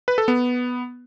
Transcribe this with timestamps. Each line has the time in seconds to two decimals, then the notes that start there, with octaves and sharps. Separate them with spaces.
0.08 B4
0.18 A4
0.28 B3